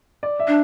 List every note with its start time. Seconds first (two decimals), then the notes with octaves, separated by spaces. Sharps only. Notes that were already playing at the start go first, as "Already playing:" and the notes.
0.23 D5
0.39 E5
0.48 D4